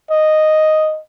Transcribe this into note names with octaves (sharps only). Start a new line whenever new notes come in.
D#5